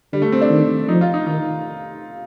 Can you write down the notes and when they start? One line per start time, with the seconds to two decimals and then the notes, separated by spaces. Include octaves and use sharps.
0.13 D3 G3
0.22 A3
0.32 C4
0.42 D4
0.51 D#3
0.89 F3 D#4
1.01 F4
1.14 D#4
1.27 D#3 D#4